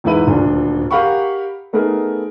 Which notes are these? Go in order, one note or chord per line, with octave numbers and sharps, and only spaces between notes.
E2 G#2 E4 B4 D#7
D#1 D2 D4
G4 A#4 F5 F#5 B5 C#6
A3 B3 D#4 G#4 A#4